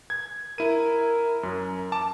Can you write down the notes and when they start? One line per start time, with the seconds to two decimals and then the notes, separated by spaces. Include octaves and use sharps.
0.10 G#6
0.58 E4 A#4 D#7
1.43 F#2
1.92 A5 D6